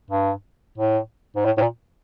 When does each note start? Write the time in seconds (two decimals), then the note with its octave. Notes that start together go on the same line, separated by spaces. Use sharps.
0.10 G2
0.78 A2
1.36 G#2
1.45 A2
1.57 A2
1.62 A#2